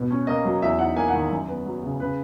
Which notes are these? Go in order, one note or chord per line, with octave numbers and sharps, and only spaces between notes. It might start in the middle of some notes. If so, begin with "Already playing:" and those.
Already playing: B2
C#4
A#3 D#5
F#3
E2 E5
D#4 F#5
A#3 G#5
F#5
D#3
F#2
B3
F#3
C#3
C#3 B4